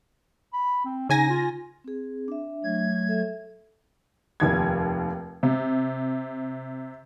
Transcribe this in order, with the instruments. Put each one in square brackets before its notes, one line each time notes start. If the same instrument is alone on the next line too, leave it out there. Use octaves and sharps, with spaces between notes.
[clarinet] B5
C4
[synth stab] C#3 G#5 A#6 [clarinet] D#4
[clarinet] F4
[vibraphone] C4 G#4
D4 E5
[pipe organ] F#3 A3 G#6
[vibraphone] A4 E5
[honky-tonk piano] F1 D#2 G#6
C3